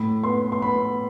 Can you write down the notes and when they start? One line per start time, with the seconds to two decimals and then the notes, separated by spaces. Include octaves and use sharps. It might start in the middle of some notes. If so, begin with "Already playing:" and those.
Already playing: A2 B5
0.24 B3 C6
0.52 C6
0.62 B3 B5